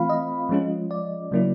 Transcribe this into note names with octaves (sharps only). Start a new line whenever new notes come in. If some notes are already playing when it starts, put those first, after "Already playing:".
Already playing: E3 A3 C4 F4 F5 B5
D#5
F3 G#3 C#4 F4
D5
C#3 F#3 A#3 C#4 E4